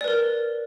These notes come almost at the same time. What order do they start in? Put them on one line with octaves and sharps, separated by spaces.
D5 B4 A#4